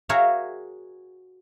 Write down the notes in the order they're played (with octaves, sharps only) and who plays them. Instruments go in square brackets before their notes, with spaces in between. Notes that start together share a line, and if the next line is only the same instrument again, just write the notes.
[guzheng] F#4 G#4 A#4 C#5 E5 F5